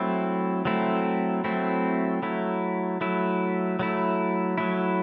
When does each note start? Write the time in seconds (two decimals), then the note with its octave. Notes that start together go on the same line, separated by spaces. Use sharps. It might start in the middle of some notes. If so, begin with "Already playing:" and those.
Already playing: F#3 A3 C4 E4
0.65 F#3 A3 C4 E4
1.44 F#3 A3 C4 E4
2.22 F#3 A3 E4
3.01 F#3 A3 E4
3.79 F#3 A3 E4
4.58 F#3 A3 E4